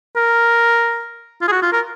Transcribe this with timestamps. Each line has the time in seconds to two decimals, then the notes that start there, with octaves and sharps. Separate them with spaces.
0.16 A#4
1.42 F4
1.48 G#4
1.52 F#4
1.63 F4
1.73 A#4